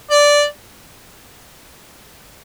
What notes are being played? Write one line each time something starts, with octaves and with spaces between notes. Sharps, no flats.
D5